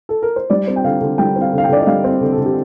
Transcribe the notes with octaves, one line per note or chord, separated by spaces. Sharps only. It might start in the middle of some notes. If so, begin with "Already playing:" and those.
A4
A#4
C5
G3 D5
C4
G5
D3 F5
D3
G3 G5
C4
F5
D3
F5
G5
D3 D5
D#5
G3 F5
C4
D3
A4
D3
G4